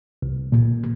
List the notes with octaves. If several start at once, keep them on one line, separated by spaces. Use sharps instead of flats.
C2
A#2